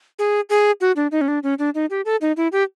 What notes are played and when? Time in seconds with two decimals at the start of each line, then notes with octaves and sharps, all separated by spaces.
0.19 G#4
0.50 G#4
0.81 F#4
0.96 D4
1.12 D#4
1.21 C#4
1.28 D4
1.43 C#4
1.59 D4
1.75 D#4
1.90 G4
2.05 A4
2.21 D#4
2.37 E4
2.52 G4